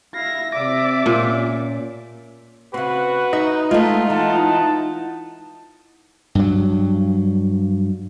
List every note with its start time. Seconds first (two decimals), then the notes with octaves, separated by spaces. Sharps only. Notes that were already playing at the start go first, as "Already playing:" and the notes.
0.15 E4 E5 F5 A#6
0.55 C3 D5 E5 D6
1.06 A#2 A#3 C#4
2.74 C#3 C4 F#4 B4
3.33 D#4 E5
3.71 G#3 A3 F4
4.10 E3 F#5 A5
6.35 G2 F#3